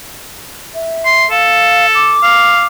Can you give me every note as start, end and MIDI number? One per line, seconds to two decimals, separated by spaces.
0.74 1.30 76
1.05 1.26 84
1.31 2.17 69
1.31 1.87 77
1.95 2.67 86
2.23 2.65 77